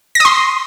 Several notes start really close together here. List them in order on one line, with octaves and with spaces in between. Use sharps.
A#6 D#6 C6